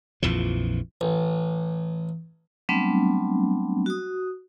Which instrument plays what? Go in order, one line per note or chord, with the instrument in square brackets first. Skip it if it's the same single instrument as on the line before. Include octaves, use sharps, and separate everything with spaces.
[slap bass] A#1 F2 E3 F3
[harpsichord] A1
[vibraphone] F#3 G3 A3 B3 C4 D4
F#4 D#6